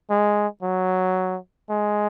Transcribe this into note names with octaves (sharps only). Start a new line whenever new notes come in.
G#3
F#3
G#3